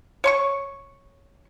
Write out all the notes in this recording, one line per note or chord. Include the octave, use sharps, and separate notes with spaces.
C#5 C6 C#6